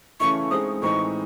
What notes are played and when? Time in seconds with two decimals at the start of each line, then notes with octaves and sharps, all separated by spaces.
0.20 C#3 E3 A3 C#4 E4 C#6
0.51 G#3 C4 D#4 G#4 D#6
0.82 A2 E3 G#3 C4 D#4 C#6